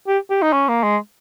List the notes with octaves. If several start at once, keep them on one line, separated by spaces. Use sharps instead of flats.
G4
G4
D#4
C#4
A#3
G#3